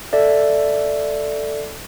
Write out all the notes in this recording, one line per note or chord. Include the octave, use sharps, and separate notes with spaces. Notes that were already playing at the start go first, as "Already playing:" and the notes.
A4 D5 E5